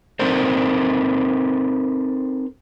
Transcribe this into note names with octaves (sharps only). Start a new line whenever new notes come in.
C4 D#4 A4 A#4 C5